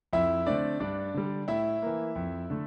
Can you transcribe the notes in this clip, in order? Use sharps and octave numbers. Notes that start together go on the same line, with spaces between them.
F2 E4 E5
D3 A3 C4 D4 D5
G2 D4 D5
D3 G3
A2 E4 E5
E3 A#3
F2
D3 A3